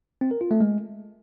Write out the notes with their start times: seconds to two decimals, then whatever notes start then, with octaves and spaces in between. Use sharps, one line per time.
0.21 C4
0.31 A#4
0.41 F4
0.51 A3
0.61 G#3